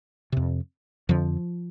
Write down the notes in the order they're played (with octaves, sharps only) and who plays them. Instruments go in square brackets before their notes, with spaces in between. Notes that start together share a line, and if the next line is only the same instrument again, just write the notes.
[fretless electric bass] F2 C3
F2 D3 F3